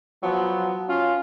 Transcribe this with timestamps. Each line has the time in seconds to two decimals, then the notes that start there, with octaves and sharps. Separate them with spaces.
0.23 F3 F#3 B3
0.88 C#4 F4